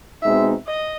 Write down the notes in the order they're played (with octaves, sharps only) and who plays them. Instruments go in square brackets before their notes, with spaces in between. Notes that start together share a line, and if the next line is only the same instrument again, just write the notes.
[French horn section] B2 G#3 C4 D#4 [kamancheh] E5
[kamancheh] D#5